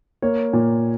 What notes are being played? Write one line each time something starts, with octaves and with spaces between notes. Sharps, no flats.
A#3 C#5
A#2